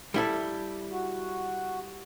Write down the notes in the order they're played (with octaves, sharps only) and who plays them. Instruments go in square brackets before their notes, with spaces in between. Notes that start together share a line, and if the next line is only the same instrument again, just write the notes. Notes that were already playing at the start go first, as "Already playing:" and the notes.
[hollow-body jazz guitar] G3 E4 A4
[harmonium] F#4